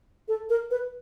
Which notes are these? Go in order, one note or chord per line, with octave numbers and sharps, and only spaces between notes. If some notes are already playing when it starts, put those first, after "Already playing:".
A4
A#4
B4